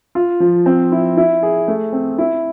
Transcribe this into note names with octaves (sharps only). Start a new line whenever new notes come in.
F4
F3
C4
E4
E4
G#4
A3
C4
E4